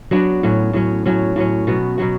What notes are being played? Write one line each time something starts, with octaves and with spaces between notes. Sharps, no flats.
F#3 B3 D4 F#4
A2 F#3 C#4
A2 F#3 C#4
A2 F#3 C#4
A2 F#3 C#4
B2 F#3 B3 F#4
B2 F#3 B3 F#4